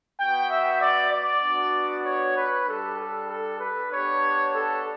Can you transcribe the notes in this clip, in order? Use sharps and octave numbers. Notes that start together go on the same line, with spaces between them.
B3 F#4 G5
E5
D5
D5
B3 D4 F#4
C#5
B4
G3 D4 G4 A4
A4
A4
B4
B3 D4 G4 C#5
A4